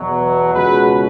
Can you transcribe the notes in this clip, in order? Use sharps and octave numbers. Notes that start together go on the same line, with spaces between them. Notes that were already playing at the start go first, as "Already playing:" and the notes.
Already playing: E2 B2 F#3
C#2 B2 F#3 G#4 B4